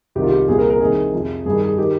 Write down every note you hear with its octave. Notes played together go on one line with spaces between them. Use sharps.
C2 C3 D#3 G4
F4
G4
C2 A#2 F3 G#4
A#4
A#4
C2 C3 D#3 G#4
F2 C3 F3
G2 D#3 G#4
G#4
D#3 G4